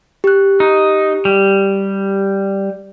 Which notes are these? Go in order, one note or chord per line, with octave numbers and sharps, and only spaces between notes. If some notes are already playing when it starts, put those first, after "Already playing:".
G4 F#6
D#4
G3